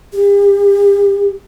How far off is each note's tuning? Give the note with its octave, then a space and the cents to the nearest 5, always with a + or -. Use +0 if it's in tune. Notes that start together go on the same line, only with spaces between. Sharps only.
G4 +40